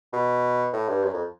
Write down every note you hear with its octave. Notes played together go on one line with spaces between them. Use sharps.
B2
A2
G2
F#2
F2